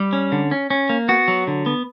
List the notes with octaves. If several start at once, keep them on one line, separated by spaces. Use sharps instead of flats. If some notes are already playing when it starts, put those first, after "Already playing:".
Already playing: G3
C#4
D3
C#4
C#4
A#3
B3 F#4
F#3
D3
B3